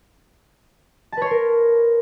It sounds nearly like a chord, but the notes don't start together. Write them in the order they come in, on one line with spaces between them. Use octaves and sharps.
A5 B4 C#5 C6 A#4